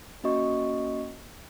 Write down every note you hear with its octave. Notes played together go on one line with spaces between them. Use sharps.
A#3 C#4 F#4 D#5 C#6